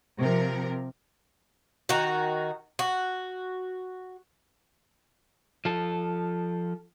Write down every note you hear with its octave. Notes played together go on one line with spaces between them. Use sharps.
C3 F3 A#4
D#3 F#4
F#4
F3 A4